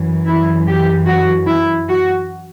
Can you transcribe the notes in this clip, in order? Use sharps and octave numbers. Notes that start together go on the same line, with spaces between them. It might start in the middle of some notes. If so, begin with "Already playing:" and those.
Already playing: F#2 E3
E4
G4
F#4
E4
F#4